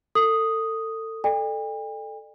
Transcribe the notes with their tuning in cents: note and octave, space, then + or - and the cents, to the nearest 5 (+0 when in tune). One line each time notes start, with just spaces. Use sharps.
A4 +25 D#6 +0
A4 +0 D5 +45 G5 +45